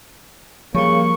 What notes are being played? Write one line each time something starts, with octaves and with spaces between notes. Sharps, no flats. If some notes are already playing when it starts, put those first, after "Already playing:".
C#3 F3 G3 A#3 C#6